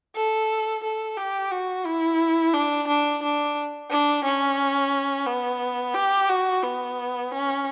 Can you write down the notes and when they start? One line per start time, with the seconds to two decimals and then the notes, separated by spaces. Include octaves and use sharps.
0.16 A4
0.83 A4
1.17 G4
1.51 F#4
1.85 E4
2.54 D4
2.87 D4
3.22 D4
3.90 D4
4.24 C#4
5.26 B3
5.95 G4
6.29 F#4
6.63 B3
7.31 C#4